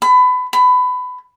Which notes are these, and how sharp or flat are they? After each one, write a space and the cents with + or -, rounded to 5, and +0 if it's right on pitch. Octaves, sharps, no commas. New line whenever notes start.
B5 +25
B5 +20